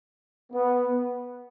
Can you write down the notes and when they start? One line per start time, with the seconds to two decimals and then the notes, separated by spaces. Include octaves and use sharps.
0.52 B3